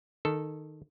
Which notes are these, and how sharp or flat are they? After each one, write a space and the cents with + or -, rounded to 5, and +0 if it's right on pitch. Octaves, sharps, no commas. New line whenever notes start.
D#3 -10 A4 +0